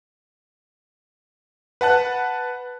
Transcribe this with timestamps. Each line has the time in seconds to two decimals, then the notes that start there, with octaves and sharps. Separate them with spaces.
1.81 B4 F#5 A5 F#6